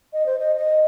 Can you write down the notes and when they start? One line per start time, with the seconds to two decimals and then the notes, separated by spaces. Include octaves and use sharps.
0.13 D#5
0.26 C5
0.39 D#5
0.57 D#5